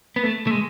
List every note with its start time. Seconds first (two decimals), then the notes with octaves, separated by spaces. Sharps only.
0.16 B3
0.23 A3
0.47 A3
0.51 G#3